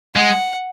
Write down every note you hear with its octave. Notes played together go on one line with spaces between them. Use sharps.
G#3 F#5